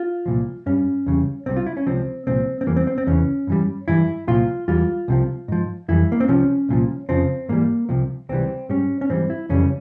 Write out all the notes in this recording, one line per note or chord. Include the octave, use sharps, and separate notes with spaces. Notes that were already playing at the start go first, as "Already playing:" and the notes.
Already playing: F4
C2 A#2 F3
G2 G3 C#4
E2 C#3 E3 G3
C2 C3 G3 C4
F4
E4
C#4
C#2 C3 F3 C4
C2 A#2 F3 C4
C4
E2 E3 G3 A#3
C4
C4
C4
E2 C#3 E3 C#4
G2 E3 G3
G2 E3 G3 E4
C2 A#2 F3 F4
E2 E3 G3 F4
C2 C3 F3
G#2 F3
F2 E3 G3 E4
A#3
C4
C2 C3 F3 C#4
C2 A#2 F3
F2 C#3 F3 C4
G#2 E3 G3 A#3
C2 C3 F3
C#2 C3 E3 G3 C4
G#2 G3 C#4
C#4
G#2 E3 G3 C4
E4
F2 C#3 E3 G3 C#4